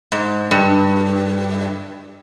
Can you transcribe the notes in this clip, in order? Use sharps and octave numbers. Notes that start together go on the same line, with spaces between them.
G#2
G2